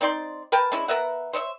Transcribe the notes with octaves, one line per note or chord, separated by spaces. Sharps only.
C4 D#4 D5 C6
A#4 B4 G5 A5
G#3 C#4 D4 E4
B3 A#4 E5 F#5
C5 C#5 D#5 E5